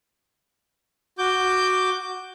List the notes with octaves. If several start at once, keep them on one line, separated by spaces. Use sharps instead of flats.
F#4 D6 G6